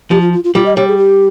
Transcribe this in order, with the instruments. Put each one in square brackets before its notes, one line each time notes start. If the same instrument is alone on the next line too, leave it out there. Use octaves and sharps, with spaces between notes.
[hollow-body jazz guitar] F3 [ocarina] G4
[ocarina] F4
F4
F4
[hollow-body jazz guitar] G3 [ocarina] F4
[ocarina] D#5
[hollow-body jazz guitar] G3 [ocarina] C#5
[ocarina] G#4
G4